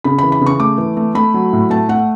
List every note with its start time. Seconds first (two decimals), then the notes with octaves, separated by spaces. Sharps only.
0.04 C#3 B5
0.19 E3 B5
0.32 B5
0.41 C#3
0.46 C#6
0.59 A3 D6
0.78 E3
0.97 A3
1.15 A3 B5
1.34 F#3
1.53 A2
1.70 A3 A5
1.89 A3 F#5